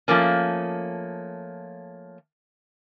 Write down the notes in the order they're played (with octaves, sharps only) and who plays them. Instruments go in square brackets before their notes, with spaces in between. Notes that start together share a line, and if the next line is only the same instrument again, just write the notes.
[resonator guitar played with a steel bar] F3 A3 A#3 C#4